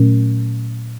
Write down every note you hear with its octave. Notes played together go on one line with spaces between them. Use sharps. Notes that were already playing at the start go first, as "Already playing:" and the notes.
Already playing: A#2 F#3 A3 C#4